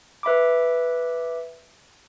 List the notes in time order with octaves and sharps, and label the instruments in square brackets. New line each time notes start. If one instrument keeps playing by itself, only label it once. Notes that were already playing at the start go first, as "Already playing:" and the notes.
[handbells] B4 E5 B5 D6